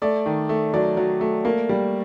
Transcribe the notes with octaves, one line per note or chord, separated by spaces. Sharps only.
A3 D5
D#3
A3
F#3 D5
F#3
A3
A#3
G3